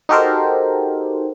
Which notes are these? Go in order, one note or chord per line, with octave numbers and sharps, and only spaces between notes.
D#4 F#4 G4 A4 A#4 C5